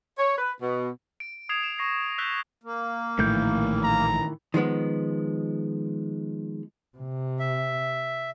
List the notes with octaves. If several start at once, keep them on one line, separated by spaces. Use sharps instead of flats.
C#5
B4
B2
D7
D#6 G#6 C7 E7 F7
E7
C#6 A#6 C7
E6 F#6 G6 B6 G7
A#3
A#1 A2 D#3 E3 A3 G6
A#5
D#3 F3 G#3 B3
C3
E5